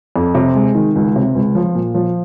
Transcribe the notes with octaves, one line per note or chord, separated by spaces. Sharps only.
F2
C3
G#3
D#3
C#2
C3
C#2
F3
A#2
F3